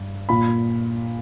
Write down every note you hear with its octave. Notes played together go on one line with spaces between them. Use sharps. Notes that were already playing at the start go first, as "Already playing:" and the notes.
Already playing: G2
A#2 B5